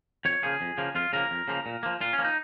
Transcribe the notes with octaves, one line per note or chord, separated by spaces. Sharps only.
F2 C#5
C#3 F3 A#3 G#4
F2
C#3 F3 A#3
F2 F4
C#3 F3 A#3 A#4
F2
C#3 F3 A#3
A#2
F3 A#3
A#2 F4
C#4
F3 A#3
D#4